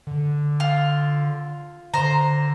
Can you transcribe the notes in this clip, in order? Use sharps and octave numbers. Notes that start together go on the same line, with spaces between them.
D3
F4
D3 C5 A#5